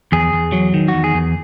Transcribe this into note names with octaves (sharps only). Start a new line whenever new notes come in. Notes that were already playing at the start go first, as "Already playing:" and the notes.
E2 G#4
E2
F#3
D#3
E2 F#4
G#4
E2